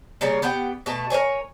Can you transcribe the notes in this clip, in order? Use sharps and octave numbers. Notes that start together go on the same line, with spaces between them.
C#3 G3 A#3 C#4
B3 G4 F#5 G5
B2 A3 A5
A#4 C5 C#5 G#5